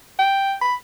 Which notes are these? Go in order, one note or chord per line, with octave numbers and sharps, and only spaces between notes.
G5
B5